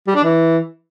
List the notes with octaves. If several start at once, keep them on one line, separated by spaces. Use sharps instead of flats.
G3
D4
E3